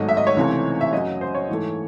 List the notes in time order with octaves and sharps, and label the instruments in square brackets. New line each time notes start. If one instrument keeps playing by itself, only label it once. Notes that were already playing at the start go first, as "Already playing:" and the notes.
Already playing: [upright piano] G#1 G#2 F#3 A3 D#5
E5
D#5
C#5
C#2 C3 E3 A3 C4
E5
F#2 C#3 F#3 D#5
C5
C#5
G#2 E3 A3